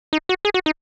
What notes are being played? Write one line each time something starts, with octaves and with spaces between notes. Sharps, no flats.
D#4
F#4
G#4
F#4
D#4